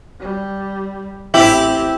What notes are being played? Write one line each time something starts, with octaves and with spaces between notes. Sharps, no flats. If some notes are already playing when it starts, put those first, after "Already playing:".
G3
A1 C4 E4 G4